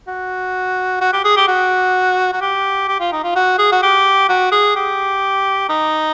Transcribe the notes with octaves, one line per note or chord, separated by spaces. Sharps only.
F#4
F#4
G4
G#4
G4
F#4
F#4
G4
G4
F4
D#4
F4
F#4
G#4
F#4
G4
F#4
G#4
G4
D#4